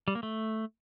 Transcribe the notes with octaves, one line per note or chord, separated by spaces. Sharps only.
G3
A#3
A3